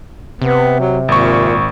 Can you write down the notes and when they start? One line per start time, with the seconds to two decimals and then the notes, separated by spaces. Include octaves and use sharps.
0.42 C3 B3
0.79 F#3
1.08 G#1 A#2 C#6